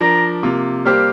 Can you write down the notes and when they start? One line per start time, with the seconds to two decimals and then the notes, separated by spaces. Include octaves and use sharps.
0.01 F3 D4 A#4 D5 A#5
0.43 C3 A#3 F4
0.85 G3 A#3 G4 C5 F5